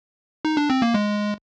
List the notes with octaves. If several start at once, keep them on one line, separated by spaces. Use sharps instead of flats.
D#4
D4
C4
A#3
G#3